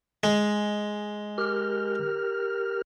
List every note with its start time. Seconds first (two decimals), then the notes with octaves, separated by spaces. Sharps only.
0.24 G#3
1.38 G4 A#4 F6